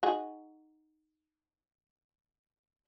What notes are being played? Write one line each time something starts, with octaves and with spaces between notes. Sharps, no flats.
D#4 F#4 G#4